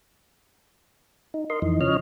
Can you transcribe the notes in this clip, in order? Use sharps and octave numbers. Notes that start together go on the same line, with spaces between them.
D#4
A#4 D#5 C6
F2 E3 D#4
C#3 F3 C#5 D#5 F6